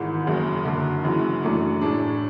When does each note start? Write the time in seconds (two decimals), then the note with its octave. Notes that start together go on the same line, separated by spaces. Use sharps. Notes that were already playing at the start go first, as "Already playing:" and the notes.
Already playing: G#1 G#2 E3
0.26 F#1 F#2 C#3
0.65 F#1 F#2 D3
1.04 F#1 F#2 E3
1.42 F#2 E3 A3 D4
1.81 A2 G#3 D4